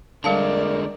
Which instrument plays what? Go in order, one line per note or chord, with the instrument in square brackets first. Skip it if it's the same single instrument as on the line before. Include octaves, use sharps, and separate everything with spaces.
[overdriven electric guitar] D3 G#3 [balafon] G3 F5 A5 [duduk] A#4 [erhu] D5